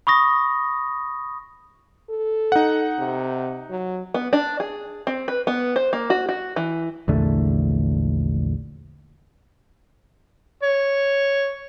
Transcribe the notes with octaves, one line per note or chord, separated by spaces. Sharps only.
B5 C#6 D#6 A#6
A4
D#4 F#5
C3
F#3
B3
D4
G#4
C4
B4
B3
C5
A#3
F#4
F#4
E3
A#1 E2 D3 A3
C#5